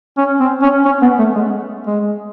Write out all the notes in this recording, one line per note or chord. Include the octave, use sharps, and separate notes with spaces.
C#4
C4
C#4
C#4
B3
A3
G#3
G#3